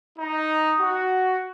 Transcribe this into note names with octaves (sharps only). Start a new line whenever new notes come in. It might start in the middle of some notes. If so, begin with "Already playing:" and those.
D#4
F#4